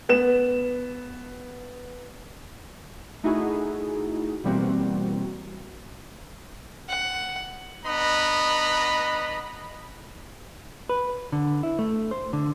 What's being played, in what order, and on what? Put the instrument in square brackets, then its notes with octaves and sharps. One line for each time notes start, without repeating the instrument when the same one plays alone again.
[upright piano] B3 E7
[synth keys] A3 D#4 E4 F#4 G#4
B2 E3 G3 A#3 C4 F#4
[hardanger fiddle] F#5
[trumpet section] B3 D4 D#5 A#5 B5
[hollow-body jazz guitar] B4
D3
E4
A3
C5
D3